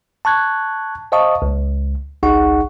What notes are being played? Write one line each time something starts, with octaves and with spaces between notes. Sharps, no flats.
A5 C#6 F#6 G#6
C5 D#5 F5 A5 C#6 D#6
C#2
G#1 C#2 D#4 G#4 F#5 C#6